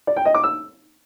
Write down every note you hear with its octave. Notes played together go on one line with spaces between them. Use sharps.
D5
G5
D#5
D6
E6